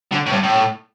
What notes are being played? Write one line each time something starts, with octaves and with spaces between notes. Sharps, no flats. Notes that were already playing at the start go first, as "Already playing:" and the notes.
D3
A2
G2
A2